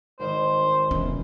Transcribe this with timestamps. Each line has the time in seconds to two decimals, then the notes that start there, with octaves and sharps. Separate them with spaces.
0.20 G#1 D#3 C5 D#5
0.91 E1 E3 C#4